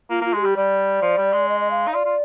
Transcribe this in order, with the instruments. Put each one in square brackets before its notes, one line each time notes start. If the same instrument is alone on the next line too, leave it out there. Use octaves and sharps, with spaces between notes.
[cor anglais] A#3 [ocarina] F4
[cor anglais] A#3 [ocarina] F4
[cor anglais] G#3 [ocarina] G#4
[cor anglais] G3 [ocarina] G4
[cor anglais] G3 [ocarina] D5
[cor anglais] F3
G3
G#3
[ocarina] D#5
D#5
F5
[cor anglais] D#4
[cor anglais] F4 [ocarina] D5
[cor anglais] F4